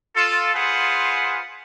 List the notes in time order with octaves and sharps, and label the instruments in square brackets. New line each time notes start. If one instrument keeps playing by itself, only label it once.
[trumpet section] F4 A4
F4 G#4 B4 C5 F#5